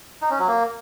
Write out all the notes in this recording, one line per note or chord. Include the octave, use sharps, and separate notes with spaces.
D#4
C#4
F#3
A#3